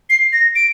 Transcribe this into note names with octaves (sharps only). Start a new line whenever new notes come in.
C7
A#6
D7